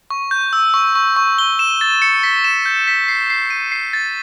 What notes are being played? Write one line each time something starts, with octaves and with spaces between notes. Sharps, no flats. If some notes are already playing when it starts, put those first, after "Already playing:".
C#6
G6
E6
C#6
C#6
C#6
G7
E7
A6
C#7
B6
E7
G6
B6
C7
C7
D#7
C7
A6